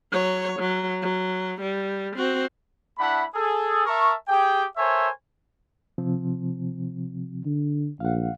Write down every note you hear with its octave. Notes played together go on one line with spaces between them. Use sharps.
F#3 C#5
F#3
F#3
G3
C4 F#4
A3 D4 E4 F#5 B5
G#4 A4
A#4 E5 A5 A#5 C#6
G4 G#4 G5
A4 A#4 C5 C#5 E5 G#5
C3 F3 C4
D3
A#1 F5 F#5